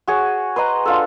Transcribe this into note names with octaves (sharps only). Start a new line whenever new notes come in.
F#4 G#4 C#5
B4 C5 D#5 A#5
D4 F4 A4